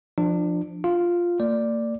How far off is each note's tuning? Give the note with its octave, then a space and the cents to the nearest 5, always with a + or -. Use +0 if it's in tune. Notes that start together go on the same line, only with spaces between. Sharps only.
F3 +0 D4 +25
F4 +0 F5 +0
A#3 -40 D5 +0